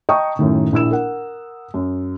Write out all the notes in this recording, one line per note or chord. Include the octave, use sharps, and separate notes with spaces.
D#5 G5 A5 A#5 C#6 D#6
F#2 A2 D#3
A#1 E4 E6 E7
A#4 F#5
F#2